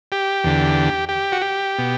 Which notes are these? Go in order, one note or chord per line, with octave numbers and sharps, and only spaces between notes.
G4
E2 D3
G4
F#4
G4
B2